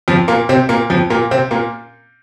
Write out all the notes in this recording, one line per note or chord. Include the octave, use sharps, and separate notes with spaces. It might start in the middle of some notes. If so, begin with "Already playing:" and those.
F2 F3
A#2 A#3
C3 C4
A#2 A#3
F2 F3
A#2 A#3
C3 C4
A#2 A#3